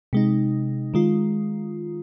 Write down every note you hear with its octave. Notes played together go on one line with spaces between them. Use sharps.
C3 G#3 D#4
D#3 G#3 F4